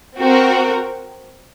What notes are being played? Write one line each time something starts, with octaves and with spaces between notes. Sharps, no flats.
C4 F#4 A#4